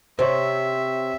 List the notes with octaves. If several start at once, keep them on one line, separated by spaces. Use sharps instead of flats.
C3 C5 C#5 E5